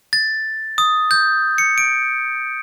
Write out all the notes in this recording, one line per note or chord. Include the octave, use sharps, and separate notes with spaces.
A6
D#6
G6
C#7
D7